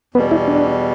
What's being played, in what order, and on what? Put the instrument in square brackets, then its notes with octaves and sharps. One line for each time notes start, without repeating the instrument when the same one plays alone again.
[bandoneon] E2 B2 G3 [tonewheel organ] B3
[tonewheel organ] E4
D4